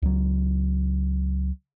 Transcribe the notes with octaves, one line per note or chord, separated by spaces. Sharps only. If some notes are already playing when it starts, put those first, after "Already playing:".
C#2 F#3